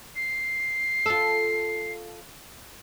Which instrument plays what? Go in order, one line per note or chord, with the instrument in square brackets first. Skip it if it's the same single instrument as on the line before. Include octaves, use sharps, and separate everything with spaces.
[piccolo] C7
[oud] F4 A4